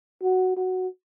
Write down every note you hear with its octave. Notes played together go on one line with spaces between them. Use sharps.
F#4
F#4